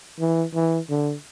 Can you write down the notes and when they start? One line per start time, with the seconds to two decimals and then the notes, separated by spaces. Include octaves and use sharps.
0.20 E3
0.55 E3
0.90 D3